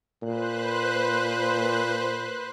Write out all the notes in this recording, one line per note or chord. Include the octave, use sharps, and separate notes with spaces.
A#2 B4 C5 F#6